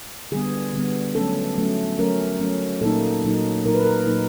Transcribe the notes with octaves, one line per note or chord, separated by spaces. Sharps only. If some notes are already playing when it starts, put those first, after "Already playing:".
D3 G3 B3 G#4
D3 G3 B3
F#3 A3 C#4 A4
F#3 A3 C#4
F#3 A3 C#4 A#4
F#3 A3 C#4
A#2 F#3 A#3 D#4 A4
A#2 F#3 A#3 D#4
A#2 F#3 A#3 D#4 A#4
B4
A#4
A#2 F#3 A#3 D#4